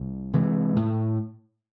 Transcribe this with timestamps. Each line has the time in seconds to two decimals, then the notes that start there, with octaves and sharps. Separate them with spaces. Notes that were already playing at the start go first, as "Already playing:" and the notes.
Already playing: C2
0.33 C3 E3 G#3
0.76 A2